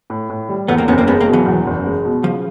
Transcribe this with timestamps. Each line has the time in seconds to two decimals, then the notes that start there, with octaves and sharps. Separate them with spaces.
0.10 A2
0.29 A2
0.49 G3
0.68 E2 A3 B3
0.78 A#3 C4
0.88 F#1 B3 C#4
0.98 A#3 C4
1.07 G#3 B3 C#4
1.21 A#3 C4
1.27 B2
1.33 E3 F#3
1.46 E2
1.67 F#1
1.85 G#3
2.05 B2
2.24 C#3 F3